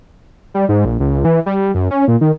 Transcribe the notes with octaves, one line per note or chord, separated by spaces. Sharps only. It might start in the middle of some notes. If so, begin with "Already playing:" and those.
G3
G#2
A#1
C#2
E3
G3
F#2
C#4
A#2
D#3